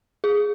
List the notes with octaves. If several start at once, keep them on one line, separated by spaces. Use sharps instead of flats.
G#4